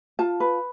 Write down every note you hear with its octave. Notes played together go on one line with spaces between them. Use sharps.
F4 A5
B4